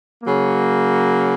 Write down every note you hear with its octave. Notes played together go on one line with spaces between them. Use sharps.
C#3 F#3 A#3